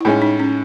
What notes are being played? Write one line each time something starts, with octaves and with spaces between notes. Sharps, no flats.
E4
A2 G#3 C#4 D#4
D#4
C#4